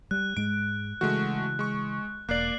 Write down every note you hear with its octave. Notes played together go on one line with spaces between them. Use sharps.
G3 F#6
G#2 G#3 D7
C#3 E3 G#3 A3 F#4 F#6
G#3 C#6
E1 A#3 D5 F#6 C7 F#7